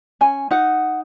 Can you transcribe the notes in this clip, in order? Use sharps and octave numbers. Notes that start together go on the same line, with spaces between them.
C#4 G#5
D#4 F#5